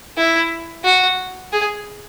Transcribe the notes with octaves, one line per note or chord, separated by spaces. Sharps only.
E4
F#4
G#4